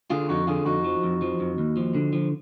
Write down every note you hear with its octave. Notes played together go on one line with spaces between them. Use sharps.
D3 F4 G#4
F2 D#4 F#4
D3 F4 G#4
F2 D#4 F#4
F3
F2
F3
F2
D#2
F3
D3
F3